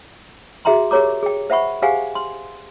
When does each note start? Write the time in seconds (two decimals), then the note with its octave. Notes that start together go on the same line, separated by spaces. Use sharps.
0.65 F#4 G#4 E5 G5 A#5 C6
0.91 G4 G#4 A#4 C#5 A#5 D6
1.23 G#4 G5
1.50 C5 E5 F#5 B5 C#6
1.82 G4 G#4 C5 F5 F#5 G#5
2.15 C6